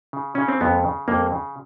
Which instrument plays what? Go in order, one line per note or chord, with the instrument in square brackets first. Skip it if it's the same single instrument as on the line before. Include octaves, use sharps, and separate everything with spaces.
[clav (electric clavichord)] C#3
C#3 C#4
C4
F2 B3
C#3
F2 A#3
C#3